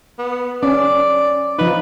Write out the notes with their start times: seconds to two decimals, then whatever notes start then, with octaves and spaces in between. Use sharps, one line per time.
0.19 B3
0.63 C#4 D5
1.59 F3 D#4 B4